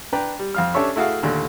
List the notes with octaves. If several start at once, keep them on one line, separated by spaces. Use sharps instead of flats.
D4 B4 G5 A#5
G3
F2 F5 F6
C#4 D4 G4 A4 C#5 E5
A3 E4 F#4 G#4 F5
D#2 A#2 D3 A3